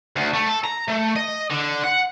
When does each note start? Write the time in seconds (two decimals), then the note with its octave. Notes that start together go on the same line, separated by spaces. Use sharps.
0.16 D2
0.34 A3
0.48 A4
0.64 A#5
0.88 A3
1.16 D#5
1.51 D3
1.84 F#5